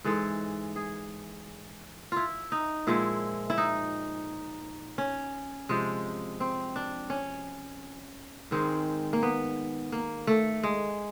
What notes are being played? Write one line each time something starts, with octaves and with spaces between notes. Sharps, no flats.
G#2 E3 G#3 A4
G#4
E4 F4
D#4
A#2 F3 G#3 E4
E4
D#4
C#4
C3 F3 G#3
C4
D4
C#4
G#2 D#3 G#3 C4
A#3
B3
A#3
A3
G#3